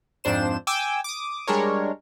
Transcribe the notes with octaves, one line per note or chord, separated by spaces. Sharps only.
F2 G#2 D4 C5 E7
G5 G#5 D6 E6
D6 D#6
G3 G#3 D4 A#4 C#5